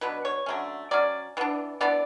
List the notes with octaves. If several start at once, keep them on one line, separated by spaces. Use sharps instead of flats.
B2 F#3 B3 D4 B4
C#5
D3 F#3 A3 C#4
F#3 C#4 D5
E3 B3 D4
E3 B3 D4 D5